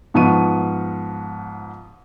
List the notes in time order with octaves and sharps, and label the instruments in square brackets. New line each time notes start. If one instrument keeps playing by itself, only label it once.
[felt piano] G#2 F3 B3 C#6 D#7